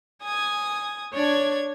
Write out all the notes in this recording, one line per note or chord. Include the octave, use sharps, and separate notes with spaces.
G#5 D#6 G#6
D4 C#5 D5 G#6